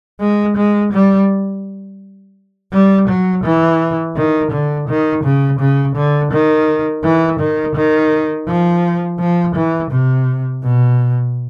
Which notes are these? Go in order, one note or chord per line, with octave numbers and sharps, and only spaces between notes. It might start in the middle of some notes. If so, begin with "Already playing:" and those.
G#3
G#3
G3
G3
F#3
E3
D#3
D3
D#3
C#3
C#3
D3
D#3
E3
D#3
D#3
F3
F3
E3
C3
B2